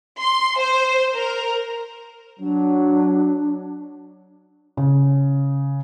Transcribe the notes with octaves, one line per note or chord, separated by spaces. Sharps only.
C6
C5
A#4
F#3 D4
C#3